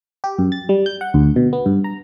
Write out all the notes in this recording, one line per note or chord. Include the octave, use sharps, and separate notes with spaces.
G4
F#2
A6
G3
G6
F#5
D2
B2
B3
G2
A#5